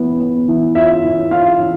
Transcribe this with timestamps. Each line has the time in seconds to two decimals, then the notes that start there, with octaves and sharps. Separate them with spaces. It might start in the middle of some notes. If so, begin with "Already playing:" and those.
Already playing: E3 B3
0.20 B3
0.48 E3
0.75 F4 E5
1.04 E3
1.31 F4 F5
1.60 E3